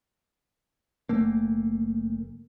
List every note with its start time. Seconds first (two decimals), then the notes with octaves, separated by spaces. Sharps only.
1.09 F#1 A3 A#3